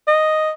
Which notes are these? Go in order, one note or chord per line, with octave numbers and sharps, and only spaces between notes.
D#5